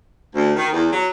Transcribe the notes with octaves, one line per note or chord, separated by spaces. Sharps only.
D2
D#3
E2
F#3